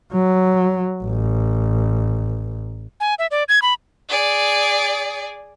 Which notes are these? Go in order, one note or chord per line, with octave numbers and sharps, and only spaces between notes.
F#3
A1
G#5
E5
D5
G#6
B5
G#4 D5